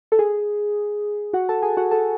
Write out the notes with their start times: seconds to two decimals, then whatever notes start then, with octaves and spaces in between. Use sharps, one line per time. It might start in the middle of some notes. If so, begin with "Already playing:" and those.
0.12 A4
0.19 G#4
1.33 F#4 F#5
1.49 A4 A5
1.62 G#4 G#5
1.77 F#4 F#5
1.91 A4 A5